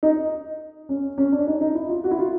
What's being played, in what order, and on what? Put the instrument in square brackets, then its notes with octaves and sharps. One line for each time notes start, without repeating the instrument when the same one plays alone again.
[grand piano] D#4
C#4
C#4
D4
D#4
D#4
E4
F4
F#4
E4
F4